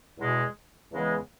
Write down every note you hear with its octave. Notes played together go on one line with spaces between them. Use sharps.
E2 B2 G#3
E2 C#3 E3 G#3 B3